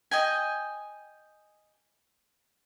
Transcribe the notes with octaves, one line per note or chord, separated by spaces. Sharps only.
D#5 G5 G#5